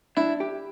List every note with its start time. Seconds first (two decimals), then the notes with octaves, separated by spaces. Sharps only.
0.17 D4 E4
0.40 G4